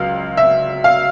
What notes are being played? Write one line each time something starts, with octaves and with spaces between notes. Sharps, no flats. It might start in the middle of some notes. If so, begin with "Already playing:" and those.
Already playing: C#2 F#3 F5
E5
F5